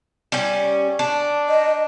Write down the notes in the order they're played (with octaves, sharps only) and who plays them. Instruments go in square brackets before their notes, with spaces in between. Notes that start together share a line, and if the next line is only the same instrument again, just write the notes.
[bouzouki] G3 C#4
D4
[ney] D#5